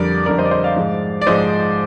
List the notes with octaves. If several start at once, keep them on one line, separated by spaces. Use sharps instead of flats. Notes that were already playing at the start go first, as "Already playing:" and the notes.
Already playing: F2 D3 G3 A#4 D5
F2 D3 G3 A#4 D5
C5 D#5
D5
C5 D#5
D5 F5
G#2 F3 G#3
D5
G#2 F3 G#3 C5 D#5